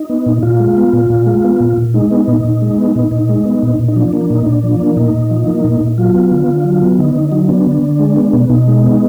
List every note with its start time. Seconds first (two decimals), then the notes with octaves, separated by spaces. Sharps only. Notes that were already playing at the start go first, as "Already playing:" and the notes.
Already playing: D#4
0.10 B3
0.26 A#2
0.43 A#2 F4
0.60 G#3
0.77 B3
0.93 A#2
1.10 A#2
1.26 G#3
1.44 B3
1.60 A#2
1.77 A#2
1.94 G#3 D#4
2.11 B3
2.28 A#2
2.45 A#2
2.62 G#3
2.78 B3
2.95 A#2
3.11 A#2
3.29 G#3
3.45 B3
3.63 A#2
3.79 A#2
3.88 D#4
3.96 F3 D4
4.08 D4
4.13 A#3
4.21 D4
4.30 A#2 D#4
4.46 A#2 D4
4.63 F3
4.80 A#3
4.96 A#2 D#4
5.14 A#2
5.31 F3
5.48 A#3
5.64 A#2
5.80 A#2
5.98 F#3 F4
6.15 B3
6.31 D3
6.48 D3
6.65 F#3
6.81 B3
6.99 D3 D#4
7.16 D3
7.32 F#3
7.49 B3 D4
7.67 D3
7.83 D3
7.99 G#3
8.16 B3
8.33 B2
8.50 B2 D#4
8.67 G#3
8.84 B3